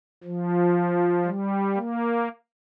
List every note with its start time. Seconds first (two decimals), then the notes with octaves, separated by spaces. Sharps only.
0.24 F3
1.25 G3
1.75 A#3